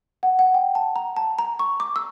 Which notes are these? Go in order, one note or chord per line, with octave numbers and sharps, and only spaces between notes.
F#5
F#5
G5
A5
A#5
A5
A#5
C#6
D6
E6